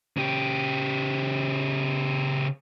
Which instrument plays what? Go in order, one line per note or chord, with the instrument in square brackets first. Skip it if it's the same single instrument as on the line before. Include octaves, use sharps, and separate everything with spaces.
[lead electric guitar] C#3 G4